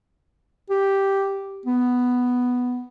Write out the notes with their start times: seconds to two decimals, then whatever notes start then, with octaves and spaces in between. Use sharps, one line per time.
0.70 G4
1.66 B3